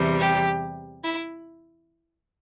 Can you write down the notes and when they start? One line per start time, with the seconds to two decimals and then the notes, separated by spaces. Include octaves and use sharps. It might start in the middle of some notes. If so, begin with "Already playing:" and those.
Already playing: E2 C3 E3 G3
0.19 G4
1.03 E4